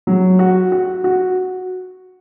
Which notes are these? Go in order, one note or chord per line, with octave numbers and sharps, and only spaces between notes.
F#3
F#4
F#4
F#4